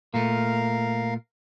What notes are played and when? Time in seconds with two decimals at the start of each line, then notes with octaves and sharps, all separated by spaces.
0.14 A#2 A3 A#4 F5